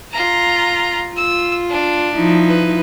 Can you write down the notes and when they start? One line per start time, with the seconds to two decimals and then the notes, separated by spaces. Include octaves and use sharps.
0.12 F4 A#5
1.17 F4 E6
1.70 D4
2.15 F3 D#4 E4
2.48 B4